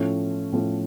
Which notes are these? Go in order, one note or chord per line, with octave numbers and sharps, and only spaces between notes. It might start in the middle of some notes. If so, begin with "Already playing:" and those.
Already playing: A2 F3 A3 C#4
A2 F3 A3 C#4